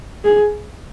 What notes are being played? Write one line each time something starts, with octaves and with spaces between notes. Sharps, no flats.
G#4